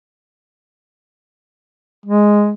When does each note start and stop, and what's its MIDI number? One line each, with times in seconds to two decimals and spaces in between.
2.06 2.53 56